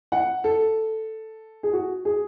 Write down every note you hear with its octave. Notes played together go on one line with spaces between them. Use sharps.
F#5
A4
G#4
F#4
G#4